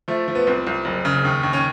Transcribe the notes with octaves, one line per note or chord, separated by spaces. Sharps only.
F3 A3
F3
B3
C2 C4
C2
F#1
C#3
D#2
D#2
C#4